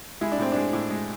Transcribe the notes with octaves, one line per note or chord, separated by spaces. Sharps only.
G#3 E4
D4
A2 C4
G#3 D4
A2
G#3